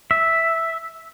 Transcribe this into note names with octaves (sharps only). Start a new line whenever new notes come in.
E5